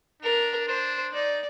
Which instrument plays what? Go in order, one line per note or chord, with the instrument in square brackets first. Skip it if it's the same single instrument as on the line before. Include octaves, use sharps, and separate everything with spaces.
[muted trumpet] D4 [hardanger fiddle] A#4
[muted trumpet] D4 [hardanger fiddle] C5
[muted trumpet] D#4 [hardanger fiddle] D5